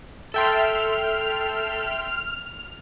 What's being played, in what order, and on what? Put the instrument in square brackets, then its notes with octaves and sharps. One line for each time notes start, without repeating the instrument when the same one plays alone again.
[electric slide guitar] A4 [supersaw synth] E5 G5 C6 [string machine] F6